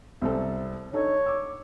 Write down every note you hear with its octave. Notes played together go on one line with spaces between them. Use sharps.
C2 C4 A4
D4 D#4 A4 C#5
D6 E6